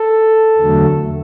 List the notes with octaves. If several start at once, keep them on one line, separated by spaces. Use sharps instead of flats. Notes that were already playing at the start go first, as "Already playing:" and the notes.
Already playing: A4
E2 D3 F#3 A3